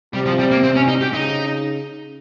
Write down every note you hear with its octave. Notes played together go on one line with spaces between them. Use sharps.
C3 G3
F3
G3
A#3
C4
C#4
D#4
G4
C#3 D#4